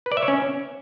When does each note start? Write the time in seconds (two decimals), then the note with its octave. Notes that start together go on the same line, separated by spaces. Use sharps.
0.06 B4
0.12 D5
0.17 E5
0.22 C#5
0.28 C#4